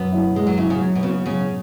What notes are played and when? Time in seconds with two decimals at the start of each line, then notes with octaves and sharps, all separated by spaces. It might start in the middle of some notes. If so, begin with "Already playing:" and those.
Already playing: F#2 B3
0.12 F#3 E4
0.36 F#2 G#3
0.47 F#3
0.58 C#3 F#3 E4
0.70 C#3
0.81 F#3
0.95 B2
1.03 C#3 B3 F#4
1.26 C#3 F#3